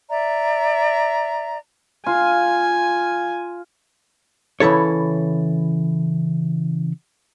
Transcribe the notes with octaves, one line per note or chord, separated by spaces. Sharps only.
D5 E5 A#5
F4 G#5
C#3 E3 E4 A4 C#5